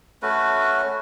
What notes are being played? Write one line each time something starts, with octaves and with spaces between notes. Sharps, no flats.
A3 C#4 F#4 B4